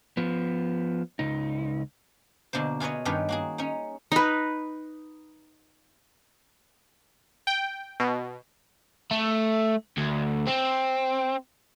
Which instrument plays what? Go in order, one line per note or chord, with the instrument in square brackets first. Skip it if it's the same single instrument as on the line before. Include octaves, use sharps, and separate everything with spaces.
[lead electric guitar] F3 B3
C#2 D#4
[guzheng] B2 D3 A#3 C5
F4 G#4 B4 C#5 D#5
G2 D#3 B3 C#4 G4 B4
A#3 F#4 G#4
C#4 D#4
[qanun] D#4 B4
[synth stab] G5
B2
[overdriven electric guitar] A3
D2
C4